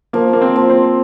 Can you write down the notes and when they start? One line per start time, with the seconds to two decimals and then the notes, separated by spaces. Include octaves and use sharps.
0.13 F3 A#3
0.33 A#3
0.41 C4
0.56 F3
0.70 C4